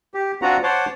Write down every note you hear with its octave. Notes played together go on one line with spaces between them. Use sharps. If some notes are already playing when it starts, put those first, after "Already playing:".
G4
C4 D4 F4 F#4 F#5 A#5
C5 C#5 F#5 A5 C6 D6